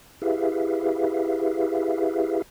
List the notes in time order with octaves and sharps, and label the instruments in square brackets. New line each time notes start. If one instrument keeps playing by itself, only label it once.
[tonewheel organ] E4 G4 G#4 B4 E5 F5